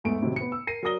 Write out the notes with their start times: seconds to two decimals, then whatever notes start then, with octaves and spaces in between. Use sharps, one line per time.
0.04 E2 G#2 A3 D7
0.22 A2 C3 D#3 F#3
0.36 B3 C#7
0.52 E6
0.67 A#4 A#6 C7 D#7
0.83 F#3 A#4 D5 D#6 A#6 G7